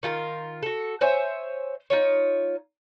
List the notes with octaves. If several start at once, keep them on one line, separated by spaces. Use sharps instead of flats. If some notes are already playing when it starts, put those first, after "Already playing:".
D#3 F4 A4 A#4
F#4 A4
C5 C#5 E5 G#5
D#4 F4 C#5